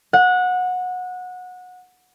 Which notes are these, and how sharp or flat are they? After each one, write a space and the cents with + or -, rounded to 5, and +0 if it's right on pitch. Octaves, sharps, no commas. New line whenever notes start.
F#5 -20